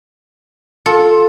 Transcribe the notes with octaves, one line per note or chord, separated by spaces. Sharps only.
F4 A4